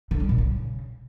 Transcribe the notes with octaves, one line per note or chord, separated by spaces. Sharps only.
D3
G3
A#2
C#3